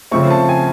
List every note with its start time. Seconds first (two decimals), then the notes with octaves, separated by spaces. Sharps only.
0.11 C#3 F3 A3 C4 C#6
0.30 A5
0.49 G#5